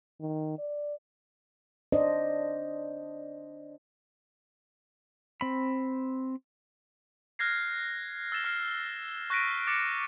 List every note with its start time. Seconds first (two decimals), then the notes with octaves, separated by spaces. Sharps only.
0.21 D#3
0.58 D5
1.92 D4 C5 D5 D#5
5.41 C4 B5
7.39 F6 F#6 G#6 A#6 C7
8.32 E6 A6 E7 G7
8.44 F6 C7
9.30 C#6 F#6 A#6 B6 D7 D#7
9.67 D6 A6 C#7 E7